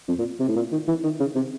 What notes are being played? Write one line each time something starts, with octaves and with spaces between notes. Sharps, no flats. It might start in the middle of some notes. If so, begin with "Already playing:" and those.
F2
A#2
C3
A2
A#2
D#3
E3
D#3
C#3
C3